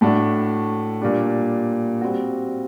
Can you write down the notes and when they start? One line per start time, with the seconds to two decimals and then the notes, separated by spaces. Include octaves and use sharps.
0.01 A2 A3 D4 F#4
1.02 A#2 G3 D4
2.01 G3 C4 F#4